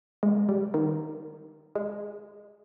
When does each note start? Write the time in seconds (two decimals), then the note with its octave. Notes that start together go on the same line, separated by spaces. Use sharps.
0.23 G#3
0.49 G3
0.74 D#3
1.75 G#3